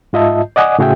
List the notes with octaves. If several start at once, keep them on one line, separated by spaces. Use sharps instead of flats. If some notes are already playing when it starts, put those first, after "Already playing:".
G#2 F4 D#5 E5 A5
D5 D#5 F#5 G#5 D6 D#6
A2 C#3 F#4 G#4 E5 G5